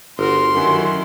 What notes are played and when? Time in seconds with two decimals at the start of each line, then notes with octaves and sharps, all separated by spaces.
0.19 G1 F4 F#4 A#4 C6
0.54 F#2 D#3 F#3 E4